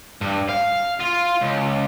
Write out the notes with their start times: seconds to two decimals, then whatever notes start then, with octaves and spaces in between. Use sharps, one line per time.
0.21 G2
0.49 F5
1.00 F4
1.42 C#2